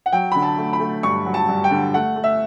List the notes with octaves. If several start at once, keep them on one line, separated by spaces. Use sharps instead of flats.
F#5
F#3 G5
D3 B5
A5
A3
B5
A3
G2 C#6
F#3
A5
G2
G5
D3
A3 F#5
A3
E5